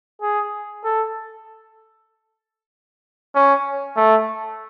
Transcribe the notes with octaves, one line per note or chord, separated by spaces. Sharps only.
G#4
A4
C#4
A3